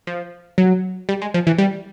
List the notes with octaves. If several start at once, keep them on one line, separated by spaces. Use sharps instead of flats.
F3
F#3
G3
G#3
F3
E3
G3